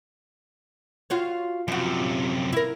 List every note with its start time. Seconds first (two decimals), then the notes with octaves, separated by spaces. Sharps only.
1.10 F4 F#4 C#5
1.68 F#2 C3 F3 F#4
2.53 E4 A#4